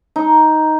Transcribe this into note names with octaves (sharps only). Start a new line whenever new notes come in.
D#4